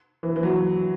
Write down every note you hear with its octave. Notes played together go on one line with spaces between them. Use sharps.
E3
E3
F#3